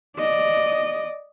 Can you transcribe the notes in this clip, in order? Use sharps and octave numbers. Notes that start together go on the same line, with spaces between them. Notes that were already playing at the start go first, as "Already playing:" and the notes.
D5 D#5